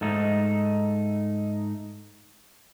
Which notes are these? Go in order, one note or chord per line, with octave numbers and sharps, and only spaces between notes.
G#2 A3 D#4